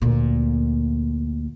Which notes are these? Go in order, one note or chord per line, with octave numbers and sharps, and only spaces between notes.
D2 A#2